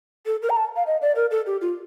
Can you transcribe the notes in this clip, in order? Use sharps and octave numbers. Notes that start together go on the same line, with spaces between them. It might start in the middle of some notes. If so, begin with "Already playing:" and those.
A4
A#4
A#5
A5
F5
D#5
D5
A#4
A4
G4
F4